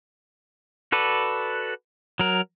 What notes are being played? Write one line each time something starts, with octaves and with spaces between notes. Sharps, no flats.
F#4 A4 B4 D5
F#3 A#4